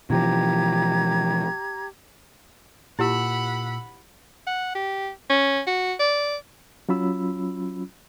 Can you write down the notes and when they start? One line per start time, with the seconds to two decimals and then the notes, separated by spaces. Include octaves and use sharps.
0.10 B2 E3 F3 G4 A#5 G#6
2.99 A#2 E4 G4 F#5 B5 E6
4.47 F#5
4.75 G4
5.30 C#4
5.67 F#4
6.00 D5
6.89 F#3 C#4 F4 B5 E6